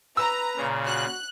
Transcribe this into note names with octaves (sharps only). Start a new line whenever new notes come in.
B4 A#5 E6
A#2 C#3
F#4 F#6